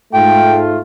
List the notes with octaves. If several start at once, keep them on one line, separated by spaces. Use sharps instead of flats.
G#2 A3 F4 G5